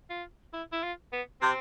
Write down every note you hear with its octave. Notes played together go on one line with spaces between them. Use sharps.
F4
E4
E4
F4
B3
C3 C4